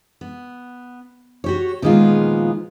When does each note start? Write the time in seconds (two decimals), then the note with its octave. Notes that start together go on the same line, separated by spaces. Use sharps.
0.21 B3
1.44 F#4 G4 C#5
1.82 A#2 D#3 F3 G#3 B3 F4